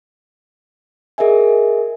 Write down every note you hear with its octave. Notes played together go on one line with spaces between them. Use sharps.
G#4 A#4 D#5 E5 G#5